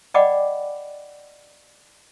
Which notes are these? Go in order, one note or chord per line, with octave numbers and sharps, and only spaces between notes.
D5 D#5 F#5 G5 B5 D6